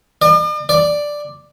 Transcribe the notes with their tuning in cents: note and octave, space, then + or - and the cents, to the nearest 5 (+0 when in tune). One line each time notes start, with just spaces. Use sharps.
D5 +45
D5 +0